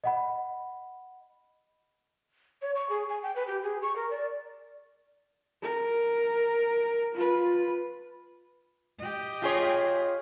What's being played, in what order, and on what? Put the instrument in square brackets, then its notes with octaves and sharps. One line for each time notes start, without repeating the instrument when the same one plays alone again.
[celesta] D#5 F#5 B5
[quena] C#5
C#6
G#4
G#5
G5
B4
G4
G#4
C#6
A#4
D5
[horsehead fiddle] A#4
F4 B4
[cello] G4 D#5
[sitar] F4 G#4 C#5